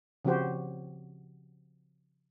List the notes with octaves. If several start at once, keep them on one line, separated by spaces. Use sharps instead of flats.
C#3 F3 C4 F#4 G4 C5